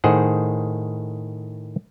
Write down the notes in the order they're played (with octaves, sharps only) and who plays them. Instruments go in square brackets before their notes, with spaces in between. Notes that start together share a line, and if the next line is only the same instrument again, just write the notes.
[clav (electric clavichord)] A2 D#3 G#4 C5 F#5